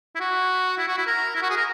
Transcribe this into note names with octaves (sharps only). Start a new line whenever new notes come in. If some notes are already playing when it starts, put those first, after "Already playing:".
E4
F#4
E4
F#4
E4
A#4
E4
F#4
G#4
A#4